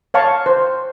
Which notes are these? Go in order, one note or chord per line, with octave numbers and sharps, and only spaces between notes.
C#5 F5 A5 C#6
C5